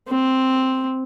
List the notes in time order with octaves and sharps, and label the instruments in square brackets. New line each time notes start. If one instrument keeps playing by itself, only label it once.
[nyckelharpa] C4